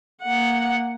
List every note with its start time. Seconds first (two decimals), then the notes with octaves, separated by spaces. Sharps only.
0.22 A#3 F#5